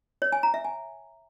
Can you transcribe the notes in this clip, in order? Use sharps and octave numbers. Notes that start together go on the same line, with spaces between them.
C#5
G#5
A#5
E5
G#5